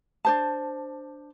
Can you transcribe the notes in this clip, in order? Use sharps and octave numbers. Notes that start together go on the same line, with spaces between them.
D4 C5 A5